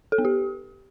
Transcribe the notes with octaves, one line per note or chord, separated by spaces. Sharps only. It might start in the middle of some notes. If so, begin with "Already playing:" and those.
A4
B3
G4